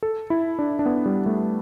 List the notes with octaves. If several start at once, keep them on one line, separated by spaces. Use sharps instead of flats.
A4
E4
D4
D4
B3
G3
A3